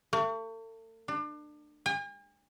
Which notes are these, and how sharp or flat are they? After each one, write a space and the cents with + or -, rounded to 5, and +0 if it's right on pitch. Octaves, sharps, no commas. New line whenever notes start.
A3 +40
D4 +30
G#5 -45